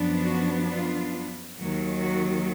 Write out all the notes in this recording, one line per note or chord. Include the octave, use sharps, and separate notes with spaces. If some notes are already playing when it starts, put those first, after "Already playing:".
Already playing: F#2 F3 B3 D4
F#4
F4
D#2 D#3 F#3
F#4